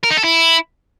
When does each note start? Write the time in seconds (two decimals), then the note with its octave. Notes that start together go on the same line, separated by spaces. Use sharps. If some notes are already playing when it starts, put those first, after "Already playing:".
0.03 A#4
0.10 D#4
0.17 A4
0.24 E4